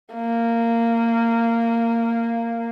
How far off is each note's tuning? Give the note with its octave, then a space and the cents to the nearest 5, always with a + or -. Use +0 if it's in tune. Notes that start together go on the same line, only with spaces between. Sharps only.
A#3 -15